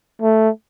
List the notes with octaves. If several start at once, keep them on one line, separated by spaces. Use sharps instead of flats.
A3